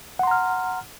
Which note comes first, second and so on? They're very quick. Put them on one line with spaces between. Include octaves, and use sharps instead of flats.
F#5 C6 A#5 F6